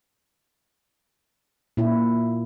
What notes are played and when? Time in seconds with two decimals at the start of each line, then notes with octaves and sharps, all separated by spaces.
1.77 A#2 E4